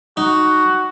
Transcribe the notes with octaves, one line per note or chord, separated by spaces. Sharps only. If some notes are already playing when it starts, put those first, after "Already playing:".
D#4 F#4